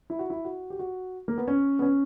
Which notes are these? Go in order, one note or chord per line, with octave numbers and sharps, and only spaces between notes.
E4
F#4
E4
F#4
G4
F#4
A#3
B3
C#4
B3
C#4